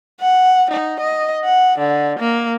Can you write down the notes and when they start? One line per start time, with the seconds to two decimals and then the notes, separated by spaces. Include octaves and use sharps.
0.20 F#5
0.71 D#4
1.00 D#5
1.45 F#5
1.78 D3
2.19 A#3